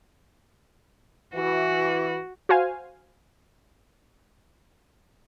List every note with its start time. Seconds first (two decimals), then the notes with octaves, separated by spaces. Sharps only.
1.34 E3 F#4
2.49 F#4 C5 F5 G#5